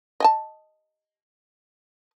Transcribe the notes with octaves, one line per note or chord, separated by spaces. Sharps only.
D#5 G#5 A5